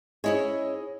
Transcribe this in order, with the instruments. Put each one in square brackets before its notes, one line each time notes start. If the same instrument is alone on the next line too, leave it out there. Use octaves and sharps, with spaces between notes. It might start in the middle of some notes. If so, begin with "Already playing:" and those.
[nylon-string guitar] C#4 E4 C#5 [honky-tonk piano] G#4 D#5